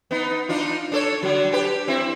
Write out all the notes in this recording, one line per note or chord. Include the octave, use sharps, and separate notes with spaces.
B3 D#4
D4 D#4 F4
D4 A4 C#5
D3 F#3
D4 G4 B4
C4 E4